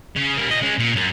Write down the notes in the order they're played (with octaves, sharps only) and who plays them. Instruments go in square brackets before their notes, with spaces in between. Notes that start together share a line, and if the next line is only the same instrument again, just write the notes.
[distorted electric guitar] C#3
G3 A#3
A#2 D#5
G#3 C#4
A#2
F#2